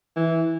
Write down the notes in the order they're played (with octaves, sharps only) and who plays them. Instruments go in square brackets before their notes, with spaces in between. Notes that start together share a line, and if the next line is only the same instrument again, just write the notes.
[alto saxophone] E3